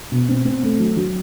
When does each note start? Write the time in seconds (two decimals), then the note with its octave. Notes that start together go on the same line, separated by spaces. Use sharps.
0.12 B2
0.29 C4
0.45 C4
0.63 A3
0.80 F#3
0.97 F#3